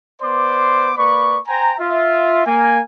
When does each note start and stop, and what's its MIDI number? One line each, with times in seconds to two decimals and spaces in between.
0.22 0.91 59
0.22 0.91 71
0.22 0.91 72
0.22 0.91 74
0.22 0.91 84
0.22 0.91 86
0.97 1.38 58
0.97 1.38 71
0.97 1.38 74
0.97 1.38 83
0.97 1.38 85
1.48 1.73 72
1.48 1.73 79
1.48 1.73 80
1.48 1.73 82
1.79 2.44 65
1.79 2.44 76
2.46 2.80 58
2.46 2.80 80